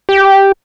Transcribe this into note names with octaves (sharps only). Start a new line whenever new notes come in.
G4